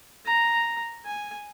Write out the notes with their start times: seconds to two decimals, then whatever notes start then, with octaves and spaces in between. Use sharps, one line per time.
0.25 A#5
1.06 G#5